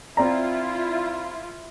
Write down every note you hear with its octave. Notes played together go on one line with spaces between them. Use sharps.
C4 E4 F4 D5 A#5